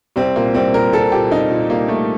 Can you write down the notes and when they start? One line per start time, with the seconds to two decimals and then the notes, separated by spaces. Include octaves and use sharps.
0.16 C2 C4
0.36 A#2 A#3
0.54 C2 C4
0.73 A#2 A#4
0.93 C2 A4
1.12 A#2 G4
1.31 C2 D#4
1.51 A#2
1.70 C2 A#3
1.88 A#2 A3